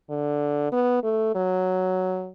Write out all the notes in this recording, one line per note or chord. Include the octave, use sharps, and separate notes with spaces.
D3
B3
A3
F#3